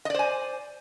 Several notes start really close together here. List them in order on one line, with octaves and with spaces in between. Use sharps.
D#5 D5 C5 G#5